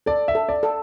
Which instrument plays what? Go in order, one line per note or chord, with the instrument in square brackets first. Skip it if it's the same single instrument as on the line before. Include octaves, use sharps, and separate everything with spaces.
[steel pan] A4 [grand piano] D5
[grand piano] E5
[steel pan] A4
[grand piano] D5
[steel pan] A4